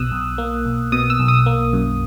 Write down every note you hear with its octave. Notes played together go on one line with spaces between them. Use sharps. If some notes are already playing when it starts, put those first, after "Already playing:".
Already playing: B1 B2 D#6 E6 F#6
B1
A#3
B1
B2 D#6
E6
B1
D#6
A#3
F#2